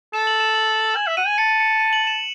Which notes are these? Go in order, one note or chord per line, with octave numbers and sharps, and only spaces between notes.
A4 E7
F#7
E7
F#7
G#5
E5
F#5 D#7
G#5
A5 C#7
D#7
C#7
D#7
F#7
E7